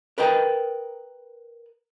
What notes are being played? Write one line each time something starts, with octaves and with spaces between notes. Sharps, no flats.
A#4 B4 D#5 G5